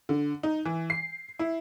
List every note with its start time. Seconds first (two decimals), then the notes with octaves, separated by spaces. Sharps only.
0.09 D3
0.43 D#4
0.65 E3
0.90 C7
1.39 E4